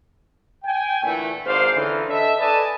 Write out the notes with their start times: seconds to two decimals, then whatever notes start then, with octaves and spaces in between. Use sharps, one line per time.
0.64 G5 G#5
1.03 A#2 D3 E3 A3
1.46 G#1 G#2 C5 D5 F5
1.75 D3 E3 C#4 D#4 F4
2.08 D4 A4 D#5 E5
2.39 A4 B4 D5 D#5 G#5 A5